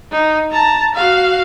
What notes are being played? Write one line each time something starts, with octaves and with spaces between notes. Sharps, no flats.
D#4
A5 A#5
F#4 F5